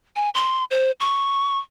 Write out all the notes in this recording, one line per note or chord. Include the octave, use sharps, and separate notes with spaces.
G#5
C6
C5
C#6